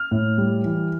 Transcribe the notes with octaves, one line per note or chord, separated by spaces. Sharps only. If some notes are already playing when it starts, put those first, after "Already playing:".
Already playing: F6
A2
G3
E3